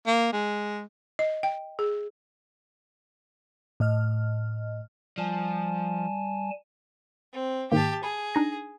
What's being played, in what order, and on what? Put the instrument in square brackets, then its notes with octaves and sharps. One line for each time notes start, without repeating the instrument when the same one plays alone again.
[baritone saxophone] A#3
G#3
[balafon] D#5
G5
G#4
[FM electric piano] A2 D#5 F6
[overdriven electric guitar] F3 [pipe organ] G3 G#5 A5
[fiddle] C4
[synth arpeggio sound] G#2 D#3 A#3 [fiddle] G4 A5
[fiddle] G#4 [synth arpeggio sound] B5
[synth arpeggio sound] D4 D#4 A#6